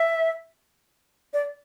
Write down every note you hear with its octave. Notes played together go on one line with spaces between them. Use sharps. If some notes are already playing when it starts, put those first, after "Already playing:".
Already playing: E5
D5